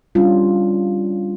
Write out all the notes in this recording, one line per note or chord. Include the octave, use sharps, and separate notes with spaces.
G3 C#4 D4 F4